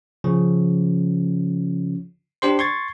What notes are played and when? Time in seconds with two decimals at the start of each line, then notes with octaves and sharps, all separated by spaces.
0.24 C#3 F3 C#4
2.42 D4 G4 C5 C6
2.59 C6 C#6 G#6 A6